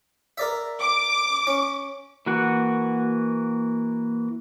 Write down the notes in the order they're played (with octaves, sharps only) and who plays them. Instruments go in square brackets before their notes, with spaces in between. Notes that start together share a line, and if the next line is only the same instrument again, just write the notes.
[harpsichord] A#4 D5 E5
[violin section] D6
[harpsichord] C#4
[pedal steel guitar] E3 A#3 F#4 F#5